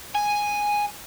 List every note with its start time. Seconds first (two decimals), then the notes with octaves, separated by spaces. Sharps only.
0.15 G#5